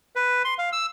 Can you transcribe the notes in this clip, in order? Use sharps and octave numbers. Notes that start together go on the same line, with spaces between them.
B4
C6
F5
E6